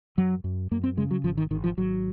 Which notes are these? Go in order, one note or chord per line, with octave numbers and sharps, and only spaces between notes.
F#2 F#3
F#2
F#2 A#3
C4
C#3 G#3
F#3
G#1 F3
D#3
G#1 D#3
F3
G#1 F#3